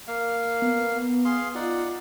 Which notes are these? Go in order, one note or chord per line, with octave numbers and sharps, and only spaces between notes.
A#3 F5
B3
G#4 F5 C6
D#4 F4 D5 F#5